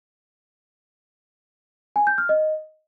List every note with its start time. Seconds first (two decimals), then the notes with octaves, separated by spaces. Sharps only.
1.96 G#5
2.07 G6
2.18 F6
2.29 D#5